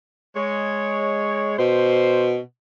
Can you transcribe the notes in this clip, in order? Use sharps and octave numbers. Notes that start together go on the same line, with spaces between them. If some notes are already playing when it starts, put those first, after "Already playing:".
G#3 C#5
B2 C5